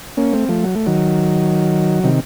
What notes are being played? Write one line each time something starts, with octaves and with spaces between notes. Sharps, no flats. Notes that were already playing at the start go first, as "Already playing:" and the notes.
A#3 C#4
A3 C4
F3 A3
F#3
A3
D#3 F#3
C3 D#3